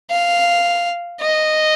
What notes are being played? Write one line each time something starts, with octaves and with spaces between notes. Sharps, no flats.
F5
D#5